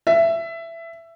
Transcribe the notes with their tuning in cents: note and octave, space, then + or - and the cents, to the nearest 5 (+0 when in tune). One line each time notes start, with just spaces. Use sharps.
E5 +15